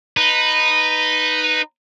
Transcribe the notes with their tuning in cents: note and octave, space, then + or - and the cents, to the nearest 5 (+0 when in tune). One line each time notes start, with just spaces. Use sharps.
D#4 -10 B4 +0